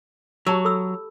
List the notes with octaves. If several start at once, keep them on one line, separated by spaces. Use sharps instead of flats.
F#3 G4 A5 E6
A4 B5 E6